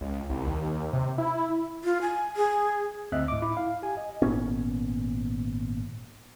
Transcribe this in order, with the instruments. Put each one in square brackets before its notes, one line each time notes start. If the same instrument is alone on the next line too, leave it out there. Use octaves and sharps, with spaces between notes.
[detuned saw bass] C#2
C2
D#2
C3
E4
[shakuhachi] F4
G#5
G#4
[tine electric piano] D2 C4 D#5 E5 F#6
A2 D6
E4
F5
G4 G#5
D#5
[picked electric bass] G#1 A#2 B3 C#4